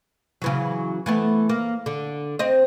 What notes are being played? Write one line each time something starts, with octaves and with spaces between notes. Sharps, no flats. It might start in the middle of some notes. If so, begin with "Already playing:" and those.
C#3 E3 F#3
E3 A3 B3
A#3
D3
C4 D#5